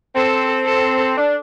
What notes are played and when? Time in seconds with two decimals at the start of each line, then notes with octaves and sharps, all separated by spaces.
0.15 C4 A4
0.66 A4
1.18 D4